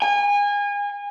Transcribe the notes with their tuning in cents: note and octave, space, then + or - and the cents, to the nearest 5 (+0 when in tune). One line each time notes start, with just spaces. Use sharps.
G#5 -30